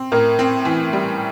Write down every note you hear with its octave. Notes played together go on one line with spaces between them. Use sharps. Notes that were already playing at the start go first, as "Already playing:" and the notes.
Already playing: C4
A2 A#4
C4
E3
G3